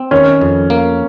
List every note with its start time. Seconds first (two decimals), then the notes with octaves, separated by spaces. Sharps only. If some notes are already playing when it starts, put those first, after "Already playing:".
Already playing: C4
0.11 D#3 C#4
0.41 F2
0.70 A#3